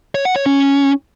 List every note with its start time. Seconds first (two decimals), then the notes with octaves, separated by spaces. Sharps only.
0.15 C#5
0.25 F#5
0.36 C#5
0.46 C#4